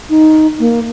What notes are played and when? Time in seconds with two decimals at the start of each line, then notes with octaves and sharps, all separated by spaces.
0.10 D#4
0.59 A#3